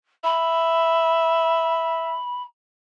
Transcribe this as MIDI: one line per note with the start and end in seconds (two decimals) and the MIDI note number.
0.24 2.16 76
0.24 2.43 83